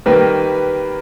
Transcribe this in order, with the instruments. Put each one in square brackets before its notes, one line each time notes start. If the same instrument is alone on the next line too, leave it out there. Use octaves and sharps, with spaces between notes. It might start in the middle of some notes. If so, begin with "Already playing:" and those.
[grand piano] D#3 G3 A#3 [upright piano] B4